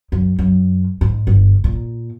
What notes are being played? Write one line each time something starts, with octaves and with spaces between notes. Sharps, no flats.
F#2
F#2
G#2
G1
A#2